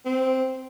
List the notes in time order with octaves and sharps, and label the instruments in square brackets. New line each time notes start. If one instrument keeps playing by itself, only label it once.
[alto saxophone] C4